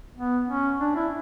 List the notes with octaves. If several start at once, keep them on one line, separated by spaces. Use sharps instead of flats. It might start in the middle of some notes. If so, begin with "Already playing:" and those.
B3
C#4
D4
E4